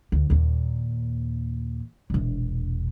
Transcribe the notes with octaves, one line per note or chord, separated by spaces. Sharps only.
D2
D#2 A#2
E1 A#1